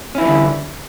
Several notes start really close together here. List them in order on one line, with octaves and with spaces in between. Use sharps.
C#4 E4 E3 G3 D3